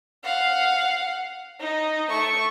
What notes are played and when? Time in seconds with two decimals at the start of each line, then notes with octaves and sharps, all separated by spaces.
0.24 F5 F#5
1.61 D#4
2.10 A3 C#6